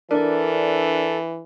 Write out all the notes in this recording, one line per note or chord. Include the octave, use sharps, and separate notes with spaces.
E3 D4 A4 A#4 D5